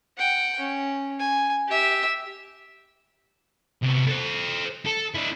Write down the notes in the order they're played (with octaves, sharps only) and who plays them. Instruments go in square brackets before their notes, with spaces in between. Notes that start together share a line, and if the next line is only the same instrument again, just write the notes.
[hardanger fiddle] F#5 G5
C#4
G#5
G4 E5
[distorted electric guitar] C3 B3
A4 C5
A4
D4 E4